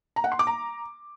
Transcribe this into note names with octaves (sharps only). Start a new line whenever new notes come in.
A#5
F#5
C6
D6
A#5